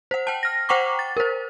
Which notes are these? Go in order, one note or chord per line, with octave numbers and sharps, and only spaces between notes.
C5 F#5
G5 A5
F6 A#6
C5 F#5 G5 A#5 C#6 D6
A6
A#4 C5